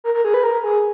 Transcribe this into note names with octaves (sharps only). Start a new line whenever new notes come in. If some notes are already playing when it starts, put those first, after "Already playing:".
A#4
A#4
G#4
B4
A#4
G#4